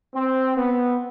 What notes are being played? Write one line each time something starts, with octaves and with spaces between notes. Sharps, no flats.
C4
B3